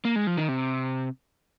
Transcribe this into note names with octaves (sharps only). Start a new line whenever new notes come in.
A#3
G#3
F3
D#3
C3